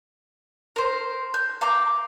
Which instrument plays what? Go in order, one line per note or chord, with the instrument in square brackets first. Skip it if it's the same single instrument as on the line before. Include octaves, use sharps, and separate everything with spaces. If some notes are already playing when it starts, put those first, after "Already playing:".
[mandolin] A#4 C5
G6
F5 A#5 D6 G6